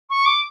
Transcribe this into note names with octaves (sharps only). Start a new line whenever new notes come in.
C#6
D6